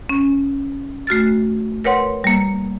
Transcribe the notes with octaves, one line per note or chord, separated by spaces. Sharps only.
C#4
A3 F#4 F6 A6
A#4 B4 C#5 F#5 C6
G3 A#3